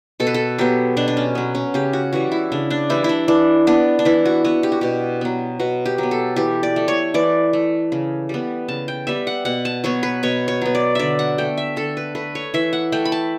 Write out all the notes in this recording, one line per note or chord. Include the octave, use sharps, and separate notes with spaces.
B2 A4
B4
A4
F#3 B3 G4
B2 D4
D4
C#4
F#3 B3
C#4
C#3 G4
F#4
E3 G3 F#4
E4
C#3 D4
D4
E3 G3 E4
D4 E4
E3 D4
B3 D4
D4
E3 E4
F#4
B3 F#4
G4
F#4
B2 G4
F#3 B3
B2 F#4
G4
F#3 B3
A4
E3 G4
D5
A3
C#5
E3 D5
A3
C#3
G3 B3
C#3 A5
G5
G3 B3 E5
F#5
B2 F#5
A5
F#3 B3 C#5
B4
B2 C#5
C#5
F#3 B3
D5
D3 D5 E5
F#5
A3 G5
E5
D3 A4
B4
A3 B4
C#5
E3 E5
F#5
A3 G5
B5
A5